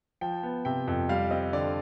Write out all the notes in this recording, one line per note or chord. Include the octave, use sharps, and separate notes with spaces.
F3 G5
B3
C3 G5
F2
G3 F5
C4 D#5
D3 D5